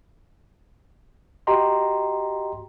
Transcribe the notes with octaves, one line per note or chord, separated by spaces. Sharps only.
F#4 G4 D#5 G5 A#5 C6